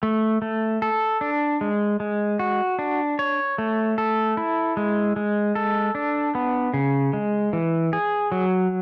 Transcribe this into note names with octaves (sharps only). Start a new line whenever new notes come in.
A3
A3
A4
D4
G#3
G#3
F#4
D4
C#5
A3
A4
E4
G#3
G#3
A4
D4
B3
C#3
G#3
E3
G#4
F#3